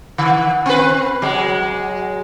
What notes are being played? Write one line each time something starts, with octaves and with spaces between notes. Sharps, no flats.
D#3
C4 B4
F#3 G#3